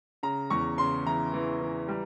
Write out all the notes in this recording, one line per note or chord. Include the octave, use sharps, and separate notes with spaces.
C#3 A#5
E2 C#6
C#3 C6
E3 A#5
E3
E3
G3